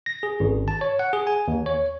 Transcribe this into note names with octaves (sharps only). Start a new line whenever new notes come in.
A#6
G#4
G#1
A5
C#5
F#5
G#4
G#5
D#2
C#5